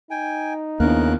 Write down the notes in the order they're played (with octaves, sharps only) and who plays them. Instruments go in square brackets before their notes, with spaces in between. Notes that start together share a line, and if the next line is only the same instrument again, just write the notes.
[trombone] D#4 [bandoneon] G5 G#5
[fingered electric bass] D#2 D4 [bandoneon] C#3 A#4 F#6 [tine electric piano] A#3 B3 E4